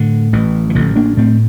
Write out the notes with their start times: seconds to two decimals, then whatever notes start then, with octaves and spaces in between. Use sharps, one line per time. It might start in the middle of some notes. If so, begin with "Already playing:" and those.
Already playing: A2 D3
0.33 A1 E3
0.70 E3
0.75 A1 D3 F3
0.96 A#3 D4
1.17 A2 A3 C4